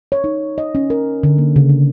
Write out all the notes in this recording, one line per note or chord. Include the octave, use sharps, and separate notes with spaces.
C#5
D#4
D#5
C#4
A#4
D3
A#3
C#3
D4